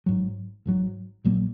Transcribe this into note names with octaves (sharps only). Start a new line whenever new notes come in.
G#1 G#2 F#3
G#1 G#2 F#3
A#1 A#2 F#3 A#3